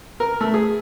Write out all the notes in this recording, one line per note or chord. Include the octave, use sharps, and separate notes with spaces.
A#4
A3
G#4